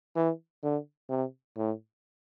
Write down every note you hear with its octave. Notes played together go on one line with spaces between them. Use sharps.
E3
D3
C3
A2